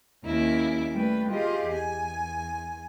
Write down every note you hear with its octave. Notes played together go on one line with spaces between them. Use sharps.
D#2 A#3 C#4 E4 D6
G3 A3 B4 G5
F4 G4 G#4 D#5 F5
E2 G#5